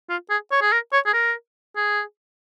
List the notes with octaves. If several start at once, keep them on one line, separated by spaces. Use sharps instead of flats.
F4
G#4
C#5
G#4
A#4
C#5
G#4
A#4
G#4